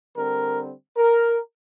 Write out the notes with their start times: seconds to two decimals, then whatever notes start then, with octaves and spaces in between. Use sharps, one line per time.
0.15 D3 G3 C4 A#4
0.95 A#4